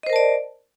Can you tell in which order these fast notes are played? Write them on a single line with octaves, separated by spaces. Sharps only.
D#5 C5 A#4 A5 D5